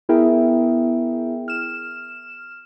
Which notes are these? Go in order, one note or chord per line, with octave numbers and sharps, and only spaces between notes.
B3 E4 G#4 A#4 E5 G5
F6 E7